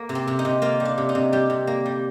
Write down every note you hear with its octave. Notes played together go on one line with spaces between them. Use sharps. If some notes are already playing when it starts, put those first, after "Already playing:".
Already playing: A#3
C3
C4
C3
D#4
C3
A#3 F4
G3
D4
C3
D#4
C3
G3 G4
C3
A#3
G3